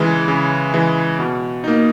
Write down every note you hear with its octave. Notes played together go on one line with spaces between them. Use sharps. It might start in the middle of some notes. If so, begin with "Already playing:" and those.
Already playing: C#3 E3 G#3
C#3
E3 G#3
B2
A#3 D#4